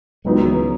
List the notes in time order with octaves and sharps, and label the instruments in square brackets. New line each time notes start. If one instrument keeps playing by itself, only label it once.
[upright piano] C#2 C#3 F#3 B3 D#4 [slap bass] G#3
[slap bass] E3